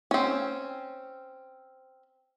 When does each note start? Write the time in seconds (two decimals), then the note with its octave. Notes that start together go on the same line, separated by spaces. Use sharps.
0.11 C4 C#4